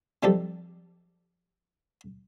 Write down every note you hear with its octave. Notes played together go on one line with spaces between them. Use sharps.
C3 F3 G3 D#4 G4 A4